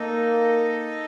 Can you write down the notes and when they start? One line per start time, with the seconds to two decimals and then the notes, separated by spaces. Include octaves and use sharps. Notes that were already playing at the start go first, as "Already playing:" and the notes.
Already playing: A#3 D#4 A4 D#5